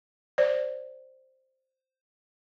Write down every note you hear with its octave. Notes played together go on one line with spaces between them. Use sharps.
C5 D5